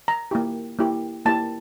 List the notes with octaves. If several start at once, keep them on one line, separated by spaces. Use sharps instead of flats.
A#5
A#3 E4 G4
A#3 E4 G4
A#3 E4 G4 A5